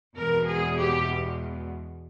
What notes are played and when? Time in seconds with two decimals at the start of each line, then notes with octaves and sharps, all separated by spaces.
0.16 E2 B2 G#3 A#4
0.47 G#4
0.78 G4